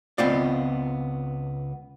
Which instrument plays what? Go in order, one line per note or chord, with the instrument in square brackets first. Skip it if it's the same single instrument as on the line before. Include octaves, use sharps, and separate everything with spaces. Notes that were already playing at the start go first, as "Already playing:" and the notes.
[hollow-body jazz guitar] C#2 B3 C4 F4 D5